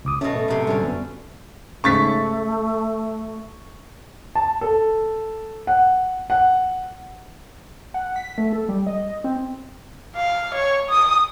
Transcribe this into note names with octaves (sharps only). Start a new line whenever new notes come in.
C#2 D6 D#6
B2 A3 C#4
A2 A4
F#2 C3
D3 G3 C#4 A4
F#2 B3
G#2 C#3 A3 C#6 A6 B6
A5
A4
F#5
F#5
F#5
B6
A3
A4
G3
D#5
C4
F5
C#5
D#6